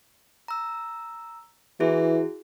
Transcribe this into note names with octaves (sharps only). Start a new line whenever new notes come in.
A#5 E6
E3 E4 F#4 G#4